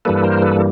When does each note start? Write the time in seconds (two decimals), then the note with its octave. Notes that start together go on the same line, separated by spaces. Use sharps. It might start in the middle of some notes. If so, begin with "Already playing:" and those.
0.05 G2 E3 G3 A#3 A4 B4
0.24 A#4 C5
0.42 A4 B4